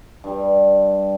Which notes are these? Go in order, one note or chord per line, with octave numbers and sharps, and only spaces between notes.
G2 G3